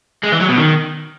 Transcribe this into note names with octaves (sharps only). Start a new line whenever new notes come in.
G#3
E3
F#3
B2
D#3